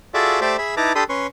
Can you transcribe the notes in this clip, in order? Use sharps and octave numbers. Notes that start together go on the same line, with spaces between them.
F4 F#4 G#4 A4 D5 E5
A3 G4 C5 D5 E5
G#4 E5 B5
D#4 E4 B4 A5 A#5 D6
D4 G4 A4 B5 C6 D#6
C#4 B4 C6 C#6